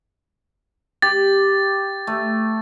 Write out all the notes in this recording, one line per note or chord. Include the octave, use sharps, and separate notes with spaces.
G4 A6
A3